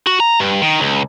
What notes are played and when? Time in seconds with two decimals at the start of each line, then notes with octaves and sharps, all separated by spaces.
0.07 F#4
0.20 A#5
0.40 G2
0.62 D#3
0.80 C#2